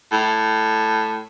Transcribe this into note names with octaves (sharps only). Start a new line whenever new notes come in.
A2